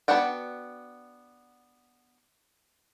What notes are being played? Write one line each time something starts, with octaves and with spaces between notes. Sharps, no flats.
B3 D4 F#4 F#5 G5